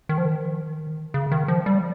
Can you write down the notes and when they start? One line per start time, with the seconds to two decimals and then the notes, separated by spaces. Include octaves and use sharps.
0.09 D#3
0.18 F3
0.25 D#3
1.14 C#3
1.31 D#3
1.48 F3
1.66 G3